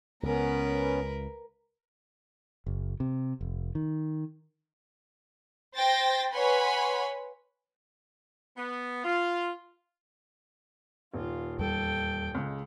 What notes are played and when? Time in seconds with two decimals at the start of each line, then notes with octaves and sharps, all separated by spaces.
0.23 C#2 C#3 B3 C#4 A#4 B4
2.66 F#1
3.00 C3
3.41 F1
3.75 D#3
5.75 C5 G5 A6 A#6
6.32 B4 C#5 F#5 G#5 B5 C6
8.56 B3
9.04 F4
11.13 D#1 F4
11.59 E2 G3 A4 G5
12.35 C#2 G#3